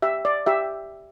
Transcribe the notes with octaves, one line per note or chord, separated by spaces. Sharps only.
G4 E5
D5
G4 E5